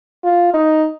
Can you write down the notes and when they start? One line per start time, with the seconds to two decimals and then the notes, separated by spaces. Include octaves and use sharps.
0.24 F4
0.54 D#4